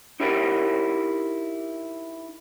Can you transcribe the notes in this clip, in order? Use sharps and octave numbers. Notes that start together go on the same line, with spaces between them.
D#4 E4 G4 A#4 C#5 D5